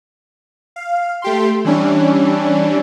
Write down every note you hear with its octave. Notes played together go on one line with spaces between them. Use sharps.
F5
A3 G4 C6
E3 G3 C#4 D4